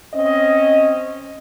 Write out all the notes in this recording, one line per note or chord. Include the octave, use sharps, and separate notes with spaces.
C4 C#4 D#5